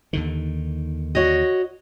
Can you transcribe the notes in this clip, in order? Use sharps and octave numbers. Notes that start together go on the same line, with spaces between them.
D#2 D3 D#3
F#4 C#5 D#5